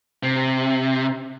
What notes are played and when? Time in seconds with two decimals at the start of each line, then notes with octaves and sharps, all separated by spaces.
0.23 C3